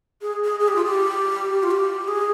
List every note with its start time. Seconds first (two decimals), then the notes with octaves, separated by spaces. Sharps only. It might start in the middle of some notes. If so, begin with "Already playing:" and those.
0.22 G#4
0.44 G#4
0.60 G#4
0.68 G4
0.76 F4
0.85 G4
1.63 F4
1.71 G4
2.08 G#4